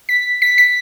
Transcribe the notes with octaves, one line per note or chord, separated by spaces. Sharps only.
B6
B6
B6